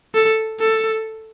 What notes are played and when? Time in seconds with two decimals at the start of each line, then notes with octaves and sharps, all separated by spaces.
0.14 A4
0.60 A4